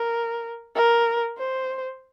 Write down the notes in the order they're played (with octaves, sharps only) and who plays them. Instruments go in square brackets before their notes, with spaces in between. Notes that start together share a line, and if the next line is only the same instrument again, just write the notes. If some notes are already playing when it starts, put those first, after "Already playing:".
Already playing: [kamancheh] A#4
A#4
C5